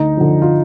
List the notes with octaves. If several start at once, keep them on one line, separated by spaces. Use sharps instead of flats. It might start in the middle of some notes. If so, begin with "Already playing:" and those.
Already playing: D2 D#4
D3 F3
F4